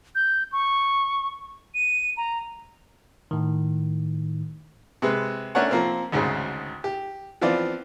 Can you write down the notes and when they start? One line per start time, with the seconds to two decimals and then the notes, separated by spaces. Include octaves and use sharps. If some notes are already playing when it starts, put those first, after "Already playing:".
0.15 G6
0.52 C#6
1.74 D#7
2.17 A#5
3.31 A2 D#3
5.02 C3 G#3 B4
5.55 A3 C#4 D4 A#4 C#5 F#5
5.71 F3 A#3 C4
6.12 G#1 D2 G#2 C#3
6.84 G4
7.41 E3 F3 B3 C4 F4 D5